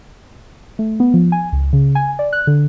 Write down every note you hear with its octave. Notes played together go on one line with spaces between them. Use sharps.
A3
B3
F3
G#5
C#2
C#3
G#5
D5
F#6
D3